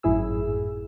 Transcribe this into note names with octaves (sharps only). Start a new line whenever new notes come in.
G#1 F#2 A2 E4 G#4 E6